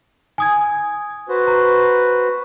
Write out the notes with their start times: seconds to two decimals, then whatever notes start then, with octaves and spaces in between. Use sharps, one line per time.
0.38 G#5 D#6 G#6
1.29 F#4 B4 C5
1.47 A#5